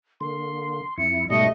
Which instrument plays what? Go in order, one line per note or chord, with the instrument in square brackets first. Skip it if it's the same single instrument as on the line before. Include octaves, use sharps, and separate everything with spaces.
[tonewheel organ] D3 A#3 [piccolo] C6
[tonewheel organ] F2 E4 [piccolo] C#7
[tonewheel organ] G#2 B2 G3 [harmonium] A3 D#5 [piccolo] C#7